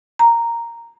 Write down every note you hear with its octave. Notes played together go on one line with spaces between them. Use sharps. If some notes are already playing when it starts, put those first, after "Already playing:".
A#5